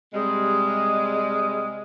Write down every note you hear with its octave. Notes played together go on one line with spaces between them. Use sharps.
C3 G3 G#3